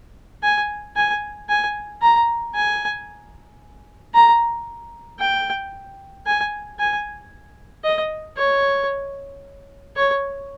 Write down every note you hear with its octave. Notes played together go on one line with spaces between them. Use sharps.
G#5
G#5
G#5
A#5
G#5
A#5
G5
G#5
G#5
D#5
C#5
C#5